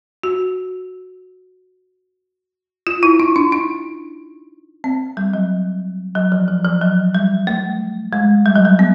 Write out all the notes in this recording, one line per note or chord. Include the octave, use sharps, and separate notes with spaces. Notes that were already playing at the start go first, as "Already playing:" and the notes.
F#4
F4
E4
D#4
D4
D#4
C4
G3
F#3
F#3
F3
F3
F3
F#3
G3
A3
G#3
G3
F#3
G3
B3